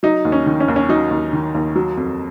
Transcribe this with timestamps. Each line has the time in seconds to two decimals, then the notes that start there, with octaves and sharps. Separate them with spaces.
0.03 F#3 D#4
0.25 D#2
0.32 C#4
0.46 D#3
0.60 C#4
0.68 D#2
0.76 C#4
0.89 F#3 D#4
1.11 D#2
1.33 D#3
1.55 D#2
1.75 F#3
1.97 F2